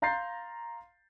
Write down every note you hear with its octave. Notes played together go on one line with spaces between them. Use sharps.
F5 A#5 C6 G6 A6 C7